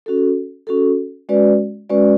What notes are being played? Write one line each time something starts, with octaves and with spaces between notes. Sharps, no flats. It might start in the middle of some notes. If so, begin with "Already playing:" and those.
C#4 F#4 A4
C#4 F#4 A4
G#3 C#4 F#4 B4 D5
G#3 C#4 F#4 B4 D5